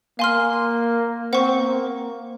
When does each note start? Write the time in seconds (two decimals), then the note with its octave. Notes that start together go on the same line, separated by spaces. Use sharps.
0.19 A#3 F5 G#5 C6 F6
1.32 C4 C5 F#5 C#6
1.60 A#3